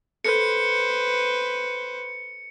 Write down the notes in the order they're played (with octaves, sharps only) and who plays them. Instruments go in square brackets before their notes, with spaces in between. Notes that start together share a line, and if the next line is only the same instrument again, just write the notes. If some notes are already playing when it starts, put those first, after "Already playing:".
[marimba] A4 [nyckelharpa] B4 C5 [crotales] C#7